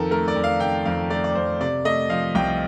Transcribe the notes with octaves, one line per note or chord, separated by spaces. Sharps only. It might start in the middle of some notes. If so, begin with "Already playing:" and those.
Already playing: F2 D#3 A4 A#4
A3 A#4
D5
F2
F5
D#3 G5
F2 F5
A3 D5
D5
F2 C5
C3 D5
A3 D#5
F3 F5
C2 G5